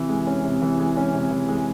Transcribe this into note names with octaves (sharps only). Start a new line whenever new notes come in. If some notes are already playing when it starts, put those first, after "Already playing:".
Already playing: C3 E3
G#3
C#4
C3
E3
G#3
C#4
C3
E3
G#3